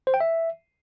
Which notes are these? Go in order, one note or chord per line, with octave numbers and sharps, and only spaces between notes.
C5
G5
E5